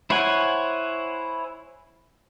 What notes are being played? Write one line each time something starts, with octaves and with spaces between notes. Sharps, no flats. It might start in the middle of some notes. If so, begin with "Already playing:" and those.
E4 C5 C#5 F#5 G#5